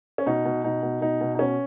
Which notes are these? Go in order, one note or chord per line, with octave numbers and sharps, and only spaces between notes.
C#4
B2 D#4
B2
B2 D#4
B2
B2 D#4
B2
D#4
B2 C#4